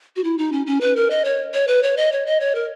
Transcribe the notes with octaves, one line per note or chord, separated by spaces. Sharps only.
F#4
E4
D#4
C#4
C#4
B4
A#4
D#5
C#5
C#5
B4
C#5
D#5
C#5
D#5
C#5
A#4